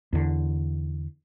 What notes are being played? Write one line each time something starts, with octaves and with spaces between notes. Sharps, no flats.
E2 D3